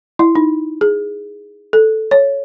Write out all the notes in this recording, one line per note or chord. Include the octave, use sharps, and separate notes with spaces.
E4
D#4
G#4
A4
C#5